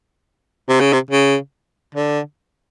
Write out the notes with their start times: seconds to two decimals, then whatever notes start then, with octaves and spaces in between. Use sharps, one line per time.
0.68 C3
0.80 C#3
0.93 C3
1.10 C#3
1.95 D3